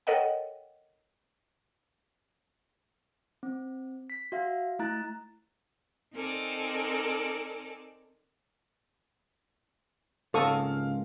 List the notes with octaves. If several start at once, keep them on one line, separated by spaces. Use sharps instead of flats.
A4 A#4 C#5 D#5 F#5 G5
C4
B6
F#4 E5 F5
A3 E4 A#5 F#6 A6
C4 D#4 A4 A#4 D5 G#5
C#2 G#2 C3 A#3 A4 F5 C#6 D#6